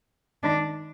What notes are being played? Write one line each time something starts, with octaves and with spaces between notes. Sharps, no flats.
D#3 G#3 D4 D#4